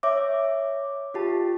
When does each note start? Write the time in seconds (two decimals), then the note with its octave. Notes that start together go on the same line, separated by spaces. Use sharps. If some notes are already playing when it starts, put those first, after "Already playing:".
0.03 C#5 E5 D6
1.14 F4 G4 A5